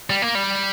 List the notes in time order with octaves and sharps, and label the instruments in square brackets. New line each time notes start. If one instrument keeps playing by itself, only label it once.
[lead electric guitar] G3
A#3
G3